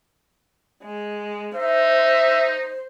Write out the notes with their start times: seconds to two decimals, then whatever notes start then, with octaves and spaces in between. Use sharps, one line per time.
0.83 G#3
1.56 D#4 C5 E5